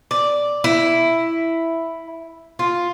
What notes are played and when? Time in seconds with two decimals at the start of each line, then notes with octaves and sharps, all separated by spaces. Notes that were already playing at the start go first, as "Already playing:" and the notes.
0.11 D5
0.64 E4
2.59 F4